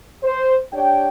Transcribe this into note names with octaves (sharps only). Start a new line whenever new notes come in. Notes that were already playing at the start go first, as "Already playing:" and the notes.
C5
D4 G4 C#5 G5